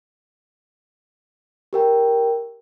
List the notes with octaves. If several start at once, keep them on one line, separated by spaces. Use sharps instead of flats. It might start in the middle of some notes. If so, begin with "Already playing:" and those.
G4 A#4 G5